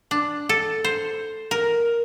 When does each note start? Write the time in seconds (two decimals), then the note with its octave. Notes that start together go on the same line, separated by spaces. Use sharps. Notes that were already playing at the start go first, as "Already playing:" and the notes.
0.11 D4
0.49 A4
0.84 C5
1.51 A#4